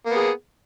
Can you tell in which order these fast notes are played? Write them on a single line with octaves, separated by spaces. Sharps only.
A#3 B3 G#4